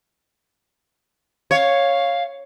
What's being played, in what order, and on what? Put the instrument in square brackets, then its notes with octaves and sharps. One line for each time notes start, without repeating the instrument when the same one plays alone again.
[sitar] C#5 [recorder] F5